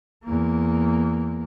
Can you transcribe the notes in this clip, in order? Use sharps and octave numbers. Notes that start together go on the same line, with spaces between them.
E2 A#3